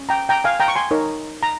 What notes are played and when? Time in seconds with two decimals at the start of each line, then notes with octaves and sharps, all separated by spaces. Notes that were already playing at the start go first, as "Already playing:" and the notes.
Already playing: C#4
0.09 G5 A#5
0.29 G5 A#5
0.44 F5 G#5
0.60 G5 A#5
0.68 C#6
0.76 G#5 C6
0.91 D#4 A#4 C#5
1.43 A#5